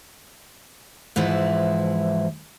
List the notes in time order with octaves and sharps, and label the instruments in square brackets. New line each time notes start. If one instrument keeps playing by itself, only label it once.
[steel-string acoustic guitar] G#2 E3 F3 E4